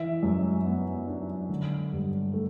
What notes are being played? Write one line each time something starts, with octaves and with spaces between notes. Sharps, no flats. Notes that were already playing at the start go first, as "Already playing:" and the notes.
Already playing: E3 E5
F#2
B3
D4
D3
G2
A3